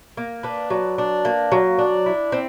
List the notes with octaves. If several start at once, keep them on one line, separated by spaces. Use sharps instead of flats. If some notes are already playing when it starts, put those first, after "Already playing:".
A#3
D4 B4
F#3
D4
A#3
F#3
D4
E4
C4